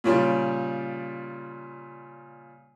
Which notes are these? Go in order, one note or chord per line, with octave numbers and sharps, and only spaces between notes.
A#2 C#3 G3